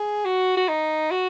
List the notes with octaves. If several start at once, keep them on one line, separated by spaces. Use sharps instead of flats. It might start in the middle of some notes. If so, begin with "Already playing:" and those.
Already playing: G#4
F#4
F#4
D#4
F#4